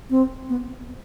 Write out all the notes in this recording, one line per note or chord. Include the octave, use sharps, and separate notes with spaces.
C4
B3